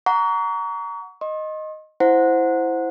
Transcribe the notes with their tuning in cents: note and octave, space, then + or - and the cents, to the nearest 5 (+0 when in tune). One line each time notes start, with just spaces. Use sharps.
F#5 +0 A#5 +0 C#6 +35
D#5 +0 C6 +45
E4 +0 C5 +0 F#5 -15